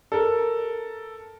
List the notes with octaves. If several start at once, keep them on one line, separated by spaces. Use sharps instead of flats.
A4 A#4